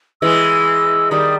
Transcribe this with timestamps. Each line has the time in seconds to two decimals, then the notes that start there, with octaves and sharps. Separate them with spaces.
0.22 E3 G#3 E6
1.11 D#3 G3 D#6